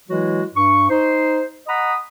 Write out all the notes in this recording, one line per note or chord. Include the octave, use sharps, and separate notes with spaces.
E3 F#3 G#3 E4 F#4
G2 C#6
D#4 C5
D#5 F#5 A#5 B5 D#6